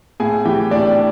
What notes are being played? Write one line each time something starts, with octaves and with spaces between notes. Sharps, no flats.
A2 G#4 G#5
E3 G4 G5
A2 D4 D5